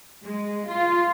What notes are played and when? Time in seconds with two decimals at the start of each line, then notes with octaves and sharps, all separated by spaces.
0.23 G#3
0.69 F4